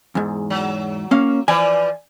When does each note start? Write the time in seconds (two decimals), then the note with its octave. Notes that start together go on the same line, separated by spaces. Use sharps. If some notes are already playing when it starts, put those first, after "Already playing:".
0.15 E2 G#2
0.50 F#3
1.11 A#3 C#4 F5
1.48 E3 F3 D5 G#5